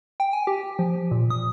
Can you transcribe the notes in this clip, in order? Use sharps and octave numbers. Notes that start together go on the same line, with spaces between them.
G5
G#5
G4
F3
A#2
D#6